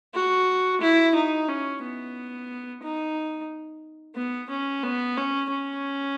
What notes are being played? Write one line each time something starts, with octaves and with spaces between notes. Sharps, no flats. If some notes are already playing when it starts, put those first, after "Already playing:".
F#4
E4
D#4
C#4
B3
D#4
B3
C#4
B3
C#4
C#4